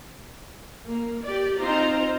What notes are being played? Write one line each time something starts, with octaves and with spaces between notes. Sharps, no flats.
A#3
G4 D5
C4 D#4 F4 C5 A#5